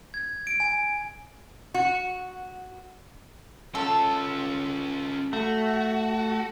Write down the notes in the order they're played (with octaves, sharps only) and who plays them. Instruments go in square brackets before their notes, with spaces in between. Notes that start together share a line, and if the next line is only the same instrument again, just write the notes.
[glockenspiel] G#6
D7
G#5
[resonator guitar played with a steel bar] F#4
[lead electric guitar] C#4 F4 [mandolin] A4
[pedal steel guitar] A3 [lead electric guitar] F#4